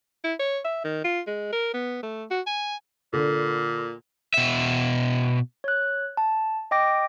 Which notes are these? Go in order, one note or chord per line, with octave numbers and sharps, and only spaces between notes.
E4
C#5
E5
D#3
F4
G#3
A#4
B3
A3
F#4
G#5
A#2 D3
B2 E5
C#5 F#6
A5
D#5 G5 D6 A#6